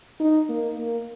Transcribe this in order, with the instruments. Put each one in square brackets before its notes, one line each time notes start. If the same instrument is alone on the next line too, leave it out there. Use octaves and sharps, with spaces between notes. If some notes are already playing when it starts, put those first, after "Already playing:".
[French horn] D#4
A#3
A#3